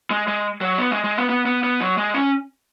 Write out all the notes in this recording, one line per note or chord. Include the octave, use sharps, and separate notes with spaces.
G#3
G#3
F#3
B3
G#3
G#3
B3
B3
B3
B3
F#3
G#3
C#4